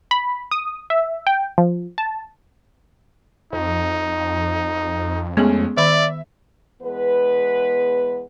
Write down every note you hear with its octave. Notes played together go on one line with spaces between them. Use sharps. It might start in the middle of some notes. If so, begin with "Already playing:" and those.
B5
D#6
E5
G5
F3
A5
F2 D#4
G#3 A3 B3 C#4 G#4
D#3 D5 E5 B5
E2 G#3 B3 B4